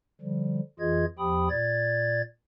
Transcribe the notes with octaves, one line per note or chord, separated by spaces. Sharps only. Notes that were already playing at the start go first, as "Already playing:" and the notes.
D3 F3 G3
F2 E3 F4 G#4 D#5 G#6
E2 F3 G4 G5 B5 D#6
A#2 D5 G#6 A6